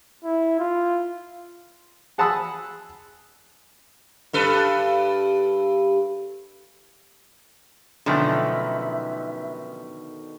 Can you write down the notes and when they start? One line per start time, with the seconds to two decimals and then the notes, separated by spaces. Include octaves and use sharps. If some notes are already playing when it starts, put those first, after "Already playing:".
0.24 E4
0.59 F4
2.18 G#4 F#5 A5 B5 D#6 E6
4.33 G2 A4 B4
8.06 F#2 B2 D3 D#3 F3 A3 E5 B5